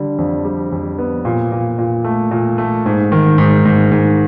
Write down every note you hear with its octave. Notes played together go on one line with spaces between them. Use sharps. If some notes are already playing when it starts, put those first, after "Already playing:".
Already playing: D3 G3
F2
G3
F2
B3
A#2
A#2
A#2
A3
A#2
A3
G#2
D#3
G#2
G#2
G#2